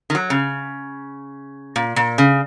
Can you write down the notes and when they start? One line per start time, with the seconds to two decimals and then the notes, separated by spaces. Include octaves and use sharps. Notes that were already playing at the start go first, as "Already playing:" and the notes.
0.10 D#3
0.15 F#3
0.30 C#3
1.76 A#2
1.96 A#2
2.18 C#3